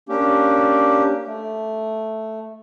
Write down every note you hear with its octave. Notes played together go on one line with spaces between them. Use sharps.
A#3 C#4 D4 G4
A3